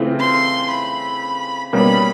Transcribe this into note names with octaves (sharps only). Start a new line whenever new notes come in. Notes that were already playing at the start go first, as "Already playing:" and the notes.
Already playing: C#3 E3 A3 C4 F4
C6
B5
B2 G3 A#3 C#4 B5